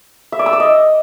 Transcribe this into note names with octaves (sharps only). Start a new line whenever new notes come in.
E5
D5
E6
D5
D#5